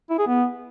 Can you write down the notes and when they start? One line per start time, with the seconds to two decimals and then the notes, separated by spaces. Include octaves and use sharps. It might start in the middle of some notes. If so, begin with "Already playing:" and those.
0.10 E4
0.19 G#4
0.27 B3